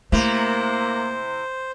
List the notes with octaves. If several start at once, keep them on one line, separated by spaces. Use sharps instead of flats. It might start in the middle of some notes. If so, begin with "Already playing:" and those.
C3 A3 A#3 E4 C5